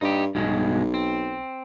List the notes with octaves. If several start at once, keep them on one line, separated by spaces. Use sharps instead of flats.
G2 D#4 G4
B1 G2 B2 G#3
C4